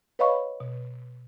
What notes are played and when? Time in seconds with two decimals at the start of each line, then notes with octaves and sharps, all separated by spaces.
0.19 B4 C#5 D#5 F5 B5 C#6
0.60 B2